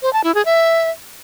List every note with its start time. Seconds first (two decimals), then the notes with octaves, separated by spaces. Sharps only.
0.02 C5
0.13 A5
0.24 E4
0.34 G#4
0.45 E5